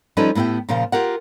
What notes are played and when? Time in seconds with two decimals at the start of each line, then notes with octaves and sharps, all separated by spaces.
0.17 F3 G3 C#4 D#4 A4 B4
0.35 A2 B3 E4 G4 G5
0.69 A#2 C#3 F3 F4
0.92 F4 G4 A#4 F#5